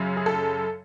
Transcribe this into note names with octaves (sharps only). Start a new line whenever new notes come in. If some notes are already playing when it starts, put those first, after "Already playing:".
Already playing: F#2 C#3
G#4
A4